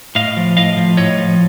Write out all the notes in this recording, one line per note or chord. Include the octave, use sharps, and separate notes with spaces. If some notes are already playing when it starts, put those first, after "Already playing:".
A2 D#5 F5
F3
A2 D#5 F5
F3
A2 C#5 D#5
F3